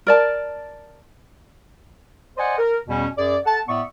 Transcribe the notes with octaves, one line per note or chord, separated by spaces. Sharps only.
A#4 D5 A5
C5 D5 D#5 F#5 G#5
A#4
E2 B2 G3 C#4
F#2 G#4 D5
A4 F#5 A5
A2 B3 D5 E5 C#6